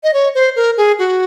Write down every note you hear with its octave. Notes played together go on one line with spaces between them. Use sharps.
D#5
C#5
C5
A#4
G#4
F#4